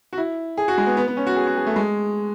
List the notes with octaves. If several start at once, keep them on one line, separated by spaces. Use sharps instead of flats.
F#4
E4
G#4
F#4
G#3
B3
B3
B3
C#4
F#4
G#4
F#4
G#4
A3
G#3